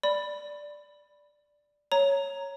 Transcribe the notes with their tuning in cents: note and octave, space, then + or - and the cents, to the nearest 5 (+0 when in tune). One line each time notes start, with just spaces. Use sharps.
D5 +0 B5 +0
C#5 +0 A#5 +0